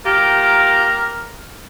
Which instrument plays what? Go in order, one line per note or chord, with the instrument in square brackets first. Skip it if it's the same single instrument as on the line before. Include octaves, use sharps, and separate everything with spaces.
[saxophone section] A#3 F4 G4 [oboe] A#4